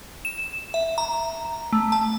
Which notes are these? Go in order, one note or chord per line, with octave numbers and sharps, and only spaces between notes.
E7
E5
A#5
A3
A5